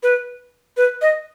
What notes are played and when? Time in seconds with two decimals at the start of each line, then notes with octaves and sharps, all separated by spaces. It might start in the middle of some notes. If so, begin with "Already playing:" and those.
0.03 B4
0.77 B4
1.02 D#5